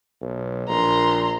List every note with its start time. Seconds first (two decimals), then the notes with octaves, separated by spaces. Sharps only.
0.22 B1
0.69 A#1 A#5 C6